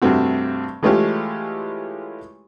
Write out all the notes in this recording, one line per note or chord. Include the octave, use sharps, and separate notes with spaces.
G2 C3 A3 C4 F#4
E3 G#3 A3 C#4 F4 G4